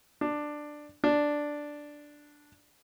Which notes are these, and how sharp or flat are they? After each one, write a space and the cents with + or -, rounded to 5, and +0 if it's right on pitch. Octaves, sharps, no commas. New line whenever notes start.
D4 +10
D4 +0